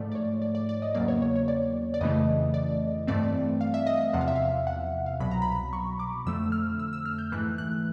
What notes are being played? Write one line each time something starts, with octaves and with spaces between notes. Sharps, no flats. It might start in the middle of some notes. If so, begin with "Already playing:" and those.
Already playing: G#2 F3 A3 D5
D5
C#5
D5
D5
D5
D#5
E2 C#3 F#3 A#3 D5
C#5
C#5
C#5
D5
D5
F2 C#3 E3 A3 D#5
D5
G2 E3 A3 C4 D5
F5
E5
D#5
D#5
E2 C3 F3 F#5
F5
E5
F5
F#5
F5
C2 B2 F#3 B5
A#5
B5
C#6
D6
F2 D3 F3 A3 E6
F6
E6
E6
F6
G6
G#2 E3 A3 F#6
F#6